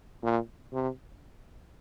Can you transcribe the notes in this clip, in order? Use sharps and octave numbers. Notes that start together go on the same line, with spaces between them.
A#2
C3